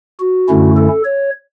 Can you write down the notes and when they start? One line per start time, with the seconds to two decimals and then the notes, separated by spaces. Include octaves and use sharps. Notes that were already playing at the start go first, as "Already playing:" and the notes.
0.20 F#4
0.48 F#2 D3 A3 C#4 E4
0.77 A4
1.05 C#5